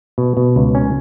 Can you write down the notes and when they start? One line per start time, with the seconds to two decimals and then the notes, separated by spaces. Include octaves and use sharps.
0.18 B2
0.37 B2
0.56 C#2
0.75 C#4